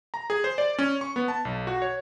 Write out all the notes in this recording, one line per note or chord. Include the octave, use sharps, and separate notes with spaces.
A#5
G#4
C5
D5
C#4
C#6
B3
A5
B1
F#4
C#5